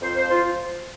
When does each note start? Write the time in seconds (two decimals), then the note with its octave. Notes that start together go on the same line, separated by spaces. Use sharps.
0.02 F2 C5
0.16 C5
0.24 F3
0.29 F4